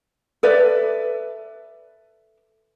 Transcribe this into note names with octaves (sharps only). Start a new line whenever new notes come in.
A4 B4 D5 E5